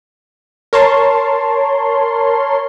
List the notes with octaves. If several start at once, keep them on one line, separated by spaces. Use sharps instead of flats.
A#4 C#5 A5 C6